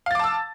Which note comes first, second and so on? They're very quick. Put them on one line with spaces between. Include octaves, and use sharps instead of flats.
F5 A6 D6 A5 E6